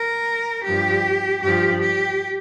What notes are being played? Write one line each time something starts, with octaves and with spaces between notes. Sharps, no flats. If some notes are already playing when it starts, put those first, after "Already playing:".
Already playing: A#4
G2 F3 G4
G2 F3 G4
G4